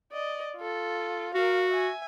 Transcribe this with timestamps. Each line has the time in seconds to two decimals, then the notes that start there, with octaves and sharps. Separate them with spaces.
0.12 D5 D#5
0.57 F4 A4
1.35 F#4 A#4 F5
1.69 E5 G#5